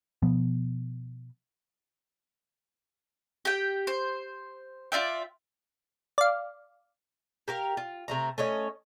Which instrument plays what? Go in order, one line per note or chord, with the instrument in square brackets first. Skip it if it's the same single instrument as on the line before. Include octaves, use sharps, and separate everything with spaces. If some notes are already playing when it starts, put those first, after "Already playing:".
[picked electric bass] B2 F3 B3
[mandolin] G4 G5
C5
F4 D5 E5 G5
[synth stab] D5 F5
[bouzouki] G4 A#4 F5
F4
C3 A3 A#5
A3 C#4 C#5 D#5